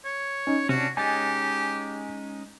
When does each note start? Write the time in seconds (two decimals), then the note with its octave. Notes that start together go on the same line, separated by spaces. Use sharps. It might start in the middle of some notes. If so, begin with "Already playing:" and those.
0.05 C#5
0.47 C#4 D#4
0.69 C3 C#4 D4 F#4
0.97 G#3 C#4 D#4 G4 G#5 A6